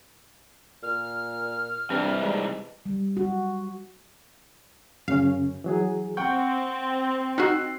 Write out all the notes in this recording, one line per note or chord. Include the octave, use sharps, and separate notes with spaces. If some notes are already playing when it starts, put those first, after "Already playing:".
A#2 F6
G2 C3 E3 G3 C4
G#3 D#4 G#4 D5
G3
F#4
F#2 C#3 C#4 F5
E3 F#3 G#4
C4 F#5 G5 C#6 G6
D#4 F#4 E6 F#6 C7